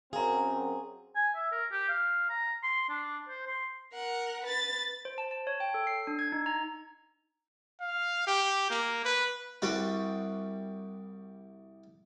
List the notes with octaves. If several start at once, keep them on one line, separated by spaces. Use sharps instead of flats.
F#2 C4 G#4 F5 A#5
G#5
E5
A#4
G4
F5
A#5
C6
D4
C5
C6
A#4 F#5
B4 A6
C5
A5
A5
C#5
G5
A4
C7
D4
G#6
D#4
A#5
F5
G4
A#3
B4
C2 G3 F#4 G4 B4 C5